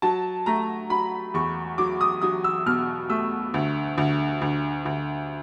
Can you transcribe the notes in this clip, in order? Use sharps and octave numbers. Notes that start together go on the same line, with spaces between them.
F#3 A5
A3 A#5
F#3 B5
E2 C#6
F#3 D6
D#6
F#3 D#6
E6
B2 F6
A3 E6
D2
D2
D2
D2